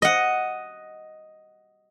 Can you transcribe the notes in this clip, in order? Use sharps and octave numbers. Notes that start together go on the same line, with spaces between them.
D#5 F#5